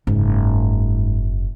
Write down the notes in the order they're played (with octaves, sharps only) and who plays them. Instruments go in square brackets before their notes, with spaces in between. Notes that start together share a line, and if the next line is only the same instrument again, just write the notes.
[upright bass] F#1 [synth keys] G#2